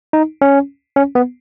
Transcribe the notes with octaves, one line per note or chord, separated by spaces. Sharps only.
D#4
C#4
C#4
B3